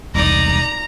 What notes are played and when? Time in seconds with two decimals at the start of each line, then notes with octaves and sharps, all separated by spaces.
0.15 E1 C2 D#4 D5 A#5